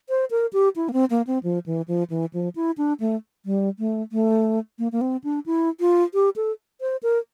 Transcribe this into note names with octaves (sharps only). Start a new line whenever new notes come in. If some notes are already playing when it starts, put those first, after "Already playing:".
C5
A#4
G4
E4
A#3
C4
A#3
C4
F3
E3
F3
E3
F3
E4
D4
A3
G3
A3
A3
A#3
A#3
C4
D4
E4
F4
G4
A4
C5
A#4